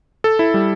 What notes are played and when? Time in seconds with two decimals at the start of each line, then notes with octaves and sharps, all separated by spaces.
0.24 A4
0.39 E4
0.54 G3